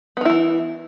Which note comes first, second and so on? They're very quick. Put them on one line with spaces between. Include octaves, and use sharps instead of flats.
B3 D#3 E4 E3